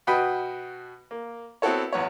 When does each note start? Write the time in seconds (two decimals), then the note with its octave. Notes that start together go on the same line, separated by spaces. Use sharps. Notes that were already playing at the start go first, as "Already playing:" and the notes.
0.07 B2 F#4 B4 D#5 G5 B5
1.11 A#3
1.62 B3 C4 E4 F#4 A4 C#5
1.93 A1 E2 B3 C#5